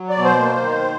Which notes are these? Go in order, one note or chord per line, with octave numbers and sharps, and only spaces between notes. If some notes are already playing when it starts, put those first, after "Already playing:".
Already playing: F#3
D5
B2
C5
A#3
D#3